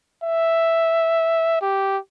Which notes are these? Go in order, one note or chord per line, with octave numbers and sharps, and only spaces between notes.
E5
G4